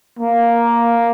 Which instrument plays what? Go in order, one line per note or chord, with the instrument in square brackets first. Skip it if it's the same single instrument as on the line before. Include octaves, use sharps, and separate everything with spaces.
[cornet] A#3